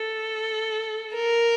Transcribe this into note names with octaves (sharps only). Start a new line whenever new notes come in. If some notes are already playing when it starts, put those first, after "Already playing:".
Already playing: A4
A#4